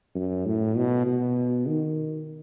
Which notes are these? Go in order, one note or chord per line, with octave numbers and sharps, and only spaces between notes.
F#2
A2
B2
B2
D#3